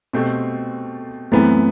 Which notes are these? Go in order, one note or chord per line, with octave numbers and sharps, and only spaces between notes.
B2 A3 C4 G4 C5
F#2 E3 A3 B3 C4